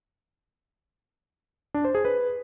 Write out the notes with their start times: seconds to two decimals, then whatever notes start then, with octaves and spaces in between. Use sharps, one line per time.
1.74 D4
1.85 C5
1.95 G#4
2.05 B4